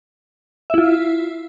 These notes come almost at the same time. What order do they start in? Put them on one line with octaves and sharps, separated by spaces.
E5 E4 F4